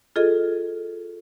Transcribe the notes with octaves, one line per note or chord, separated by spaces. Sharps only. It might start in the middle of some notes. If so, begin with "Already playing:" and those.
F4 G#4 A4 D#5